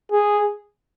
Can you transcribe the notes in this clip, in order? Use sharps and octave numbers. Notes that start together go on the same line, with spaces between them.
G#4